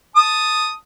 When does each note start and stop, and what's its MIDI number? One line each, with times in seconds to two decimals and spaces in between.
0.16 0.71 81
0.16 0.71 87